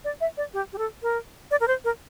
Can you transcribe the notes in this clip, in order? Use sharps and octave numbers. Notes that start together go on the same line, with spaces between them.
D5
E5
D5
G4
G4
A4
A#4
D5
A#4
C5
A#4